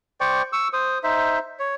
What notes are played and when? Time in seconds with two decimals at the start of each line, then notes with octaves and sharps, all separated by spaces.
0.20 C5 D5 G5 C#6
0.53 C#6 E6
0.73 C5 D#6
1.04 D#4 C5 E5
1.59 C#5